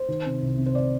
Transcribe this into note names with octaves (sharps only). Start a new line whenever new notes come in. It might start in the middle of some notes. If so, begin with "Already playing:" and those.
Already playing: C5
D#3
C3
C2
C3
C5
D5